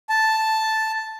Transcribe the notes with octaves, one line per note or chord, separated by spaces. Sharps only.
A5